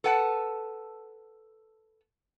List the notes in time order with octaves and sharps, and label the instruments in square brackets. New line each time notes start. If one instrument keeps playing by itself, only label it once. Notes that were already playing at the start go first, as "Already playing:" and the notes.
[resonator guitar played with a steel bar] A4 B4 F#5 A5